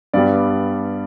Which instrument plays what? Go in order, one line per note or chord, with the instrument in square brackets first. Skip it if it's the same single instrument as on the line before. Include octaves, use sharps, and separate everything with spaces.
[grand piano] G2 G3 B3 D5